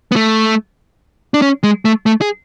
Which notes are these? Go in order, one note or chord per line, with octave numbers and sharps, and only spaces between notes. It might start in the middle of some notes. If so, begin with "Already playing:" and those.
B3
A3
D4
C#4
G#3
A3
A3
G#4